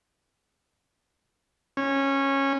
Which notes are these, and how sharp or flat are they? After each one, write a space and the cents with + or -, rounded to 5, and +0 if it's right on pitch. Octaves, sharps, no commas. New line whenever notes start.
C#4 -15